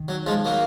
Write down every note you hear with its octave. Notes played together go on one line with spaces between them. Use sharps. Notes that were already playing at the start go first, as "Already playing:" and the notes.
Already playing: D#3
F#3
F3 G#3
F#3 A#3